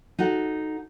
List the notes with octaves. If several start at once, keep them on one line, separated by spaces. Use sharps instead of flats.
D#4 F#4 A4 F#5